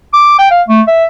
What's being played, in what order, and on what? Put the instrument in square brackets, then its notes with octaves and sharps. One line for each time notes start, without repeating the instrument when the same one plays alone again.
[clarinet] D6
G5
F5
A3
E5